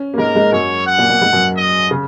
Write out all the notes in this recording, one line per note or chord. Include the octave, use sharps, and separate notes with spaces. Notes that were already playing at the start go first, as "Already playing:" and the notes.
Already playing: C#4
A#3
G#2 G#3 A#4
G#2 G#3
F#2 F#3 C#5
F#5
A#2 A#3
A#2 A#3
G#2 G#3
F#2 F#3
D#5
C#3